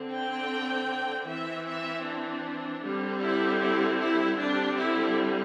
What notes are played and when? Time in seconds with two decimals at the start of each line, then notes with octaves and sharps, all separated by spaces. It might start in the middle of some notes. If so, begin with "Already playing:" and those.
Already playing: D3 C4
0.12 G5
1.27 E3 C4 E5
1.66 E5
2.06 D4
2.83 D3 G3 C4
3.23 E4
3.61 E4
4.00 E4
4.39 D3 G3 C4 D4
4.78 E4